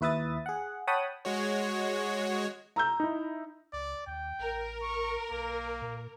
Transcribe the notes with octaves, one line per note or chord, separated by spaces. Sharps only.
D#2 E4 B4 E5 D#6 A6
G#4 F#5
C#5 F#5 G5 A5 B5 D#6
G#3 F#4 C#5
A#5 E6 G6
D#4 E4
C#2 D5
D#2 G5
A1 A#4
C#6
B1 A#3
A#2